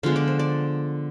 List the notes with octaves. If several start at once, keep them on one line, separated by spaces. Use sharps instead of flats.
D3 F3 G#3 B3 F5
D5
C5
D5